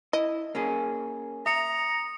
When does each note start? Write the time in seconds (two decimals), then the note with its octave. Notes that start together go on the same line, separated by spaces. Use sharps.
0.13 E4 D#5
0.55 A#3 C#4 G#4
1.46 E5 A#5 D#6 C#7